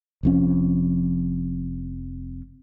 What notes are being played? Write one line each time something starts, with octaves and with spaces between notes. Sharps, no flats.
F1 F2 C#4